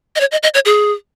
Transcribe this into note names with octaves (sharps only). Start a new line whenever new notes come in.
D#5
C#5
D#5
D#5
C#5
G#4